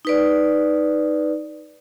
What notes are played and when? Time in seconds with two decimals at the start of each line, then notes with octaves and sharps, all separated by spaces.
0.05 D#4 B4 D5